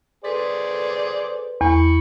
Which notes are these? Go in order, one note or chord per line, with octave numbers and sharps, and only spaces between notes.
G#4 A4 B4 C5 D5
E2 B5 C#6